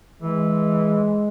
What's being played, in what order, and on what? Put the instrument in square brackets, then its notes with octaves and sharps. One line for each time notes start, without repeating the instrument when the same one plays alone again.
[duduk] E3 [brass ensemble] G#3